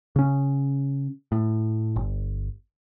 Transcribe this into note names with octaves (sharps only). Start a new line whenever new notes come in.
C#3 C#4
A2
G1